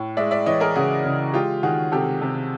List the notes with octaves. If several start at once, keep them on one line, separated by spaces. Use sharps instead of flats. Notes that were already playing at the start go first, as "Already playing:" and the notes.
Already playing: A2
G#3 D5 E5
D5 E5
E3 C#5 D#5
G#4 A#4
C#3 F#4 G#4
C#3
G#3 F4 G4
D#3 F#4 G#4
C3 G4 A4
C3